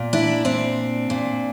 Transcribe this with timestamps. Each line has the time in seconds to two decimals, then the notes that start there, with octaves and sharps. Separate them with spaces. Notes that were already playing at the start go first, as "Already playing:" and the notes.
Already playing: A#2
0.13 D4 E4
0.45 C4 D4
1.10 A#2